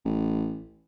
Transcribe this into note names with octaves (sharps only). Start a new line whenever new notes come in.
A1